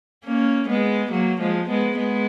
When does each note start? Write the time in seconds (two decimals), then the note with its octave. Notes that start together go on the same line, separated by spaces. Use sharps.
0.25 A#3 C#4
0.68 G#3 B3
1.11 F#3 A#3
1.40 F3 G#3
1.69 G#3 B3
1.97 G#3 B3